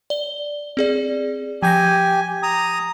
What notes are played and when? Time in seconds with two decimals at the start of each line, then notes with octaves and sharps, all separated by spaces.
0.10 D5 G7
0.77 C4 G#4 D5
1.62 F3 G4 G#5 G6 A#6
2.43 A#5 D#6